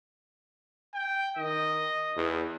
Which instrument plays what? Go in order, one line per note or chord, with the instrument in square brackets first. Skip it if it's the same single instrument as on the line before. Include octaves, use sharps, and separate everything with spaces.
[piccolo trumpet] G5
[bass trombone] D#3 [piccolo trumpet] D#5
[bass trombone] E2